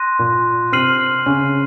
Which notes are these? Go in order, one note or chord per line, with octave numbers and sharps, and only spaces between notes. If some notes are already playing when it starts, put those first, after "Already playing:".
Already playing: C6 F#6 A#6 D#7
A#2 A#3
C3 C4 F6 C7 D#7 F#7
C#3 C#4